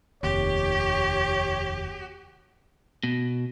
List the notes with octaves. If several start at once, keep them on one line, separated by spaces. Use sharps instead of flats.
F1 D#2 G4 C#5
B2